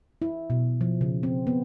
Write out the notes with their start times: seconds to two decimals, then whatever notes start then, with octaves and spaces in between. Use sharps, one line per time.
0.22 E4
0.50 B2
0.81 F3
1.01 C#3
1.23 C4
1.47 B3